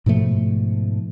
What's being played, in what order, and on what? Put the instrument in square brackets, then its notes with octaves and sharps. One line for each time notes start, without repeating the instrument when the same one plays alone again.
[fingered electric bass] G#2 B2 F3 A3